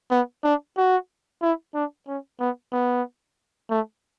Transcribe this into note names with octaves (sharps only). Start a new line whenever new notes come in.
B3
D4
F#4
E4
D4
C#4
B3
B3
A3